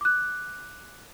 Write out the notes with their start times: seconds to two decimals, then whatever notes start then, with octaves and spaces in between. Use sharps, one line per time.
0.01 D6 F#6